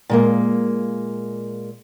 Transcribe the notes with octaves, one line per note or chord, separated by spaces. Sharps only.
A#2 G#3 A#3